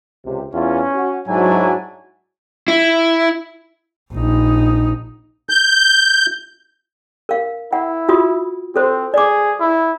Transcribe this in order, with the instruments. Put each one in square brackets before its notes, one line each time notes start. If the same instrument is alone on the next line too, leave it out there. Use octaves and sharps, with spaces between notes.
[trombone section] C#2 C3
[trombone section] E2 E4 F4 [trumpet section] C#4
[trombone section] F#4
[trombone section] G#2 F#3 [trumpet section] D4 E4 G#5
[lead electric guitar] E4
[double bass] A#1 D#4
[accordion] G6
[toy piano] A#4 F5
[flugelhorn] E4 [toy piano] F#5
[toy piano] F4 F#4 D#6
[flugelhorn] C4 [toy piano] A4 C5 C6
[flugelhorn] G#4 [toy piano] D5 D6
[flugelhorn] E4